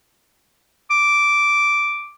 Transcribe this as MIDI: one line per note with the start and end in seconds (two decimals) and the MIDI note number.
0.91 2.15 86